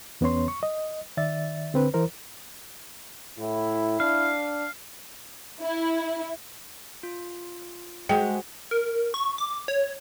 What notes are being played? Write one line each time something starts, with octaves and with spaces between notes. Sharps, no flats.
E2 B3 C#4 C#5 C6
C#6
D#5
D#3 D5 E5 A6
D3 C4 B4
E3 E4 A#4 C5
A2 E4
D4 F5
E4
F4
G#3 F#4 C5 F#5 G5
A#4
C#6
D6
C#5